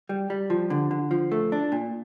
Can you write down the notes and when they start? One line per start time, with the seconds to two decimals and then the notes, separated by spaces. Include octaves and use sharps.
0.09 G3
0.30 G3
0.50 F3
0.70 D3
0.91 D3
1.11 F3
1.32 A3
1.52 D4
1.72 A#2